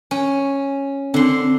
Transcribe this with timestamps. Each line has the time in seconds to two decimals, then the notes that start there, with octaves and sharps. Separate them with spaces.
0.11 C#4
1.14 D3 C4 C6